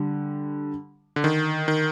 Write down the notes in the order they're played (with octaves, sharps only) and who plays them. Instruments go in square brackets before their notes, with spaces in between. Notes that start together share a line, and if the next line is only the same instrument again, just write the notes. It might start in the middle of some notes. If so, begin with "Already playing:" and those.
Already playing: [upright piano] D3 G3
[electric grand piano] D3
D#3
D#3